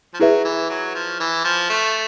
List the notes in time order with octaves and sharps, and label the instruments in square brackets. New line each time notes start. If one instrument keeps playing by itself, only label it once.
[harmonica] F3
[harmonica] F#3 [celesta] E4 G#4 B4 E5
[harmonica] E3
F#3
F3
E3
F3
A3